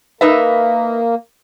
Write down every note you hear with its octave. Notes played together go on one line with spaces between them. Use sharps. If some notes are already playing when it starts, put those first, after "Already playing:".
A#3 D#4 B4 E5